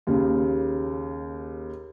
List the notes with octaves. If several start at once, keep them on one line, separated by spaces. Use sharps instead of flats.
D#2 C#3